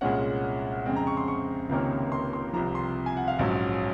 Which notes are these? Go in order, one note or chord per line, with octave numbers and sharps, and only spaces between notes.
C2 A#2 G#3 C#4 F#5
F2 C#3 G#3 C4
A#5
C#6
C6
C#6
C#2 C3 D#3 A#3 C#4
C6
C6
C2 C3 F3 A#5
C6
G#5
F#5
F5
A#1 G#2 F#3 C#4